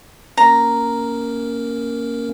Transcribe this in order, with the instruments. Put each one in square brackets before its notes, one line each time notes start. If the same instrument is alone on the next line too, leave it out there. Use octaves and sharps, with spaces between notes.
[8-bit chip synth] A#3 C#4 A#4 [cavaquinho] A#5